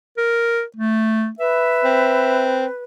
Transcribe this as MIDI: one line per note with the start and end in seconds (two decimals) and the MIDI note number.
0.18 0.63 70
0.77 1.29 57
1.39 2.84 71
1.39 2.52 76
1.84 2.66 60